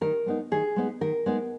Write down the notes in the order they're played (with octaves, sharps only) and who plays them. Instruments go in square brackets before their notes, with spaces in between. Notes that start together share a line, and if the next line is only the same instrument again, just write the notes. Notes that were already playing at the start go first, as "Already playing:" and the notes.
[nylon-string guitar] D#3 A#4
G#3 B3 D#4
D#3 G#4
G#3 B3 D#4
D#3 A#4
G#3 B3 D#4